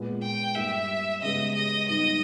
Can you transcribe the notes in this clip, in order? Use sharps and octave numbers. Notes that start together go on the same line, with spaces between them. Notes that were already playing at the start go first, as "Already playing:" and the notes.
Already playing: A#2 G#3 B3
G5
G2 G3 A#3 E5
C#3 G#3 B3 G4 D#5
D#5
G#2 G3 B3 D#4 D#5